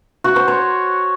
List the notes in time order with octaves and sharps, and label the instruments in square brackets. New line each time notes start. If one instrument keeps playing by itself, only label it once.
[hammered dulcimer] F#4
C5
C#5